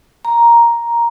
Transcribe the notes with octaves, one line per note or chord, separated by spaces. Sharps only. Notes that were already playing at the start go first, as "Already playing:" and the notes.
A#5